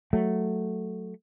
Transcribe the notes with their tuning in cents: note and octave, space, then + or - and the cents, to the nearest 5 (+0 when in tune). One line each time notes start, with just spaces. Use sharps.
F#3 +0 A3 +0